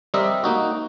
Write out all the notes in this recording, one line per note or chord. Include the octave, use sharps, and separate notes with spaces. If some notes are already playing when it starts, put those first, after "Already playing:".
G3 C4 A#4 D#5 E5
A#3 D#4 F#4